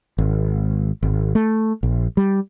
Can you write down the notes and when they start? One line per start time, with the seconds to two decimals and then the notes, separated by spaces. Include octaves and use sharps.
0.18 G#1
1.03 G#1
1.35 A3
1.83 A#1
2.17 G3